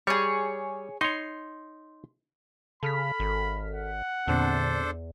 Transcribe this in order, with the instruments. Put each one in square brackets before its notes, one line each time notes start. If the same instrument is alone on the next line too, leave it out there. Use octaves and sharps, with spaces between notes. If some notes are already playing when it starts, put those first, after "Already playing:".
[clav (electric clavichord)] G3 [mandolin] G#4 C#5
[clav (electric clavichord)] D#4 C#5 [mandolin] C6
[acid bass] C#3 [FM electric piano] A4 F6 B6 [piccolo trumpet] B5
[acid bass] G#1
[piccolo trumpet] F#5
[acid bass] E2 [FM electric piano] A#2 D3 C4 [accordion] D4 A4 C5